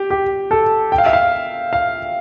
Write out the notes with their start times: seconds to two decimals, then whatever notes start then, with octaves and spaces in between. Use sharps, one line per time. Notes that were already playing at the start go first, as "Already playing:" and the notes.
Already playing: G4
0.10 G4
0.51 A4
0.92 G5
0.98 F5
1.06 E5
1.13 F5
1.73 F5